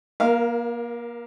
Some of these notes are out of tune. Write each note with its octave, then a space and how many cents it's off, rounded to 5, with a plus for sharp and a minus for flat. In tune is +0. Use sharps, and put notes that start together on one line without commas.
A#3 +30 A#4 +0 F5 -10